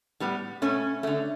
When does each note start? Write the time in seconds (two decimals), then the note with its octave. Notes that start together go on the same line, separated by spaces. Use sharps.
0.20 A2 G3 B3
0.62 B2 A3 C#4
1.03 D3 A3